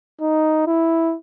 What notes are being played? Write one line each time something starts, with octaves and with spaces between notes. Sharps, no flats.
D#4
E4